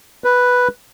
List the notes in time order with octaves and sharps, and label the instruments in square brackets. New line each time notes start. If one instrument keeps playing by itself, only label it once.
[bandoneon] B4